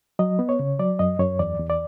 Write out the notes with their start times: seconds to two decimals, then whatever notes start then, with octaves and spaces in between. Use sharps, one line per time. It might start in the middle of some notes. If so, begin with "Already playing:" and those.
0.19 F#3 D#5
0.39 B3
0.49 C#5
0.59 C#3
0.79 F#3 D5
0.99 F#2 D#5
1.20 F#2 C#5
1.39 E2 D5
1.60 E2
1.70 D5